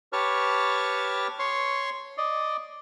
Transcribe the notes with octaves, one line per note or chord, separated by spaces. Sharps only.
G4 B4 C#5 A5 C#6 F6
C#5 C6 C#6
D5 D#5